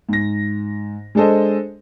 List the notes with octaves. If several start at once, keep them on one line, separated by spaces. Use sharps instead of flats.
G#2 A#6
G#3 D4 G#4 A4 C5 D#5